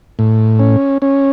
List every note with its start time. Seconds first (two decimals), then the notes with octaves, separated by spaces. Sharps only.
0.19 A2
0.59 C#4
1.02 C#4